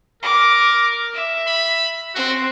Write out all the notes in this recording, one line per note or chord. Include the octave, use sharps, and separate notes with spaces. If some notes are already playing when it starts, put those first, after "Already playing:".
A#4 D6
E5
B5
C4 F#4